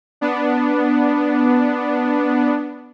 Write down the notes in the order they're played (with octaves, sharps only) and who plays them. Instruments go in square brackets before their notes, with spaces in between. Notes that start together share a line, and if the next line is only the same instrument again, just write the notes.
[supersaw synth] B3 D4